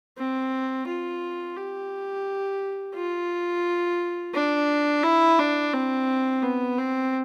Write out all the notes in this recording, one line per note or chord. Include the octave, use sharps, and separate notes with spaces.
C4
F4
G4
F4
D4
E4
D4
C4
B3
C4